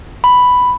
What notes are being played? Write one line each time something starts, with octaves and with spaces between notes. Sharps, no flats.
B5